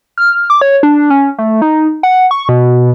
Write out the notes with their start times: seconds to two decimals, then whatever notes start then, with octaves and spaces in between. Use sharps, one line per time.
0.18 F6
0.50 D6
0.61 C#5
0.83 D4
1.10 C#4
1.38 A3
1.62 D#4
2.03 F#5
2.31 C#6
2.49 B2